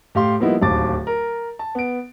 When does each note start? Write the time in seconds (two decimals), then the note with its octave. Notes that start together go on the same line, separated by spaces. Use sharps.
0.15 A2 G4 F5 C6
0.40 F3 G3 A#3 B3 D#4 E4
0.62 D1 D#2 A5 D6 A6
1.07 A#4
1.59 A5
1.75 B3 D7